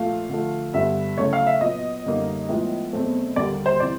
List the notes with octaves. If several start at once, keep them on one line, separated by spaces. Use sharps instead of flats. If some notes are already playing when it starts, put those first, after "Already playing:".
Already playing: A#2 F3 A3 F5
D3 F3 A3
G2 D3 G3 B3 E5
C#3 F#3 A3 C#4 E4 C#5
F5
E5
A#2 F#3 B3 D#5
F#2 D3 G3 A#3 D#4
A2 F3 G#3 B3 E4
E2 B2 F#3 A3 C4
D#2 D3 G3 A#3 D5
C5
C3 E3 D5